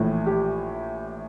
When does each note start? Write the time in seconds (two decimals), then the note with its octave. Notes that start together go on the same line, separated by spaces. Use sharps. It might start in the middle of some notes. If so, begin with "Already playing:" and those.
Already playing: A#1 A2 E3
0.26 G4